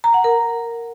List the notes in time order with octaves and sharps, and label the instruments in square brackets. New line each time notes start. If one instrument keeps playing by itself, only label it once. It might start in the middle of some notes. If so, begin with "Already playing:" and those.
[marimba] A#5
F#5
A#4